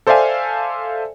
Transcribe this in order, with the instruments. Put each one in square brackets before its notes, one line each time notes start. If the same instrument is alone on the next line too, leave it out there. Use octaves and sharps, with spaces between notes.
[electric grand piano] A4 C5 D5 E5 F5 G#5